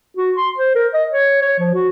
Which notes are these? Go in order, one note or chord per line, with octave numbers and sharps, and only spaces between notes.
F#4
C6
C5
A#4
D#5
C#5
C#5
F3
F#4